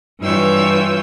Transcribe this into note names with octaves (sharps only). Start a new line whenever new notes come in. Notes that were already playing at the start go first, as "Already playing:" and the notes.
G2 E3 F4 C#5 E6 G6